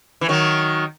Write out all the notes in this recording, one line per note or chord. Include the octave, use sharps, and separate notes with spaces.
E3
D#3 F#3